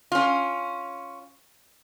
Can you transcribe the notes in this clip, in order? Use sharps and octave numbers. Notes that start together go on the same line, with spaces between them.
C#4 F4